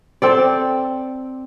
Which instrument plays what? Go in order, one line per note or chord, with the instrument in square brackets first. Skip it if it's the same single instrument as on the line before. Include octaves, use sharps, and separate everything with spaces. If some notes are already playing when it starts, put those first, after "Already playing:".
[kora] C4 A4 D5